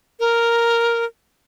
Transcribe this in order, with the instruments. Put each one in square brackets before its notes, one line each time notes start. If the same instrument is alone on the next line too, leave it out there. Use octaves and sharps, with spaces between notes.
[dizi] A#4